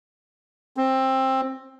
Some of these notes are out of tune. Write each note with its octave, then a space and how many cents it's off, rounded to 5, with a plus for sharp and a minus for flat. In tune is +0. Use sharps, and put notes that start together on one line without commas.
C4 +15